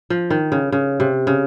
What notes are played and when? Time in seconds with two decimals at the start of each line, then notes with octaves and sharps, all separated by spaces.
0.10 F3
0.30 D#3
0.52 C#3
0.72 C#3
1.00 C3
1.27 C#3